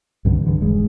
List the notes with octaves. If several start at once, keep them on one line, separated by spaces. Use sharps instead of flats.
C2 G2 D3 D#3
G2 D3 E3
D#1 E2 G2 G#3